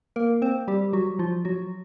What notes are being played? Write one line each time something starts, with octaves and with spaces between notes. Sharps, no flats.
A#3 A#4
C4 C5
G3 G4
F#3 F#4
F3 F4
F#3 F#4